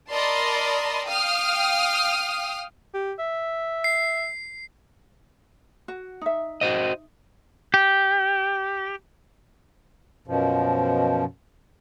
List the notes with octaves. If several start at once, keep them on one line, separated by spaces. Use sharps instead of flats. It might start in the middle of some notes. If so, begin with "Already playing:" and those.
A#4 D5 D#5 A5 B5 C6
F5 G5 D#6 F6
G4
E5
C7
F#4
D#4 E5
F#4 C5 D#5
G4
F#2 B2 F3